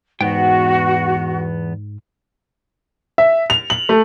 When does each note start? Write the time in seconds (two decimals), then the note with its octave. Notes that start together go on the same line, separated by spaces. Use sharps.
0.21 E2 G#2 B3 F#4 G5
3.18 E5
3.50 F7
3.70 F#7
3.89 A3